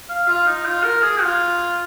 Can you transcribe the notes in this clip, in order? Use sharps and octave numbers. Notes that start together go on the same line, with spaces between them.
F5
F4
D#4
F4
A#4
G#4
F4